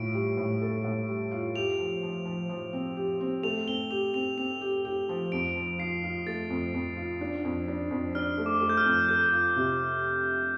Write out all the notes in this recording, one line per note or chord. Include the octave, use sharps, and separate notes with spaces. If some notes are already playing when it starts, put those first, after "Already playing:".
Already playing: A2 F4 D7
G3
A2
A4
A2
G3
F4
G4 F7
F3
F3
F3
F3
C4
G4
C4
A3 F7
C4 G7
G4 F7
C4 F7
C4 F7
G4
G4
F3
F2 D7
F3
F4 C7
F4
A3 A6
F2
F2
F4
D4
F2
D4
F2
D4 F6
A3
D6
A3
G6
F6
F2
A4 G6
F4
C3